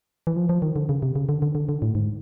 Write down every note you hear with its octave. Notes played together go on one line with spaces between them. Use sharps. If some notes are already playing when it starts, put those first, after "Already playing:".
E3
F3
F3
D#3
D3
C#3
C3
C#3
D3
D3
D3
D3
A2
G#2